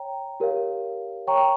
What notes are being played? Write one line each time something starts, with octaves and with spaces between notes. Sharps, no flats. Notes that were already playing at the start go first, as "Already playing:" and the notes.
Already playing: C#5 G5 A#5
G4 A#4 C#5 F5
C#5 G5 A#5 C#6